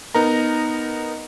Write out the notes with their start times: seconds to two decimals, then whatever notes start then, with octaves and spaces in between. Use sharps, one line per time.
0.15 B3 D#4 A#4 A#5